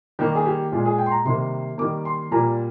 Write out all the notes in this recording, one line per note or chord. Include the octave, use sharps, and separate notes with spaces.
D#3 G3 A#3 G4
G#4
G4
A#2 G#3 F4
G#4
G5
C6
A#5
C3 D#3 G3 A#3 C6
D#3 G3 A#3 D6
C6
A#2 G3 A#3 A#5